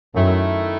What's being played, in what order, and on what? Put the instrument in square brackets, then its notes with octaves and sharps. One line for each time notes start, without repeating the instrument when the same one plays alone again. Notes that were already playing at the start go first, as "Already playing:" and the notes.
[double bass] F#2 [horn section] D#3 A3 E4